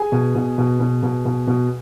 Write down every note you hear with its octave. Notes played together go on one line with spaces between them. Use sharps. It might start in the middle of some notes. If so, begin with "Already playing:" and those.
Already playing: G#4 G#5
B2
B2
B2
B2
B2
B2
B2